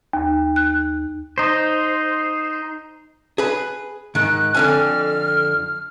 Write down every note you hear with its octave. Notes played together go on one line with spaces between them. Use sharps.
D#2
F#6
D#4 C5
G#4 B4
G#2 D#3 F#6
F2 D3 G#5 F6